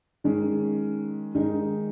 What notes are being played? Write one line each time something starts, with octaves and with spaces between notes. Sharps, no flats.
D#3 G#3 C#4
D#3 G#3 D#4